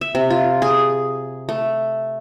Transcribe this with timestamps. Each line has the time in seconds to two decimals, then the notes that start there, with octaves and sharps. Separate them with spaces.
0.01 E5
0.15 C3
0.30 F4
0.62 G#4
1.49 A3